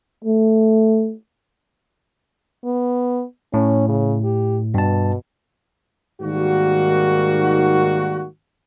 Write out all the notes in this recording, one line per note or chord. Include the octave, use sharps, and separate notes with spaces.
A3
B3
A2 C#4
C#3
G4
G2 B2 A5
G#2 D#3 G3 A#3 F#4